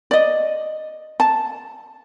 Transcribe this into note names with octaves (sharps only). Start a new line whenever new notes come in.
D5 D#5
A5